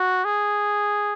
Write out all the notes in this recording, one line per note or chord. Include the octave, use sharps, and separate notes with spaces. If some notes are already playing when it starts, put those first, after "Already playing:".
Already playing: F#4
G#4